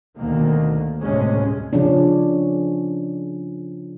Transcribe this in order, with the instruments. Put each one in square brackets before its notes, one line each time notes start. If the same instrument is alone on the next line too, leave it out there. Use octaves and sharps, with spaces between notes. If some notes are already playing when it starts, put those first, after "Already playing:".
[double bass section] D2 B2 D#3 A#3
G1 D2 A2 C3 G#3 C#4
[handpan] C#3 F3 C#4 D4